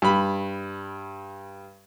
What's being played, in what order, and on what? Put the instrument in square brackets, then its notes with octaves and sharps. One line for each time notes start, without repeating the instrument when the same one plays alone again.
[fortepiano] G2 B5